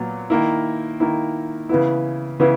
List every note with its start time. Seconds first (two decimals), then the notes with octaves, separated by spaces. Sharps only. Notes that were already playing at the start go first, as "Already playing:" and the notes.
Already playing: A#2 F#3 B3
0.30 D#3 A#3 E4
1.00 D#3 A#3 E4
1.69 C#3 E3 B3 E4
2.40 C#3 E3 B3 E4